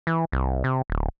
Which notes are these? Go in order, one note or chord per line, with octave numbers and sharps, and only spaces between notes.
E3
C2
C3
D1